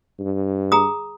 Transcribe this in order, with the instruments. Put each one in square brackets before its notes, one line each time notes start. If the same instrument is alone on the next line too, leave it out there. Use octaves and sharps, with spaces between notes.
[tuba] G2
[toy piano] G#4 A#5 D#6